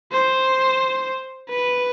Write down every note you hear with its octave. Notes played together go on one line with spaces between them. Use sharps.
C5
B4